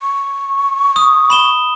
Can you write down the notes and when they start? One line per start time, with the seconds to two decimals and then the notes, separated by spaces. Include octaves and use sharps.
0.02 C#6
0.96 D#6
1.30 B5 E7 G7